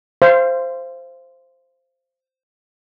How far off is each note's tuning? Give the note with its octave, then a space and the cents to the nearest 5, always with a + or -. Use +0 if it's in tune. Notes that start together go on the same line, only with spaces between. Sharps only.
C5 +0 F5 -30